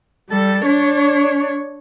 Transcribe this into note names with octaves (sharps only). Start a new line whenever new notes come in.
G3 A4
D4 C#5